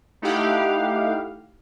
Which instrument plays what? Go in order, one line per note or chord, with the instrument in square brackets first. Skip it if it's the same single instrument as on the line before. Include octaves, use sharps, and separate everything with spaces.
[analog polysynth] A3 D#4 E4 G4 F5 F#5